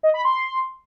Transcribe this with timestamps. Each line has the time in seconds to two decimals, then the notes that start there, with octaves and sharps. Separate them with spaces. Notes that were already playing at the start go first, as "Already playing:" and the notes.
0.03 D#5
0.14 B5
0.24 C6